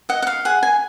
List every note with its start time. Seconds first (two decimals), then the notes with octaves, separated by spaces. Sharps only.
0.09 D#5 F#5
0.22 F#5
0.27 F5
0.45 G#4 F#5
0.63 G#5